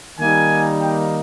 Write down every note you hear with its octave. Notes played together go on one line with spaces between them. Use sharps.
D#3 G3 A#3 D#4 G#5
G5